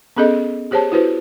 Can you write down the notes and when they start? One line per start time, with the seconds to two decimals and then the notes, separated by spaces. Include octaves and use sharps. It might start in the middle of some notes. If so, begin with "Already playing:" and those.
0.17 B3 C#4 G#4 A4 D#5
0.71 G4 G#4 C5 C#5 A5
0.92 E4 F#4 B4 C5